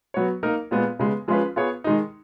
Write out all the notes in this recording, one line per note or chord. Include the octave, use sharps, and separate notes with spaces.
F#3 B3 F#4 C#5
A#3 D#4 A#4
A#2 G#3 B3
C#3 G#3 B3
F3 G#3 C#4 F4 B4
B3 F4 G#4 C#5
D#3 G#3 D#4